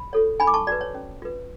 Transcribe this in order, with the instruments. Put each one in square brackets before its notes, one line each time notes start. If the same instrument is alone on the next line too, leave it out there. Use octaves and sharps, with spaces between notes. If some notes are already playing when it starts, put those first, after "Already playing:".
Already playing: [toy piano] B5
F4 A4 C#5
D4 G#5 B5
D6
A5 C#6
F#4 B4 D5
C#5
C#4
F4 B4